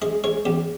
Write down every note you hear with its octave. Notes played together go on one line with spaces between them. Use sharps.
G#3 D#5
G#3 C#5
E2 G4